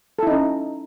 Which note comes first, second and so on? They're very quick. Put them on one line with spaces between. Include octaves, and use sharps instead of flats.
A4 E4 D#4 C#4